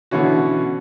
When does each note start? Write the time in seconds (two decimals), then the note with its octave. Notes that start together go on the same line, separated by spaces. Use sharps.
0.11 B2 D3 E3 C#4 F#4